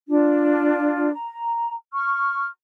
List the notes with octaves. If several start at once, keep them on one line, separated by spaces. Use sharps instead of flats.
D4 F4
A#5
C#6 F6